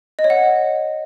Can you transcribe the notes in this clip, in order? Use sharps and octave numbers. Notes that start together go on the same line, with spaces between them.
D#5
C#5
F#5